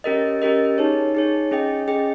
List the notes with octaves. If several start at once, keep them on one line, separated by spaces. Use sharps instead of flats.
C#4 G4 A#4 D#5
C#4 G4 A#4 D#5
D#4 G#4 C#5
D#4 G#4 C#5
C#4 G#4 D#5 G5
C#4 G#4 D#5 G5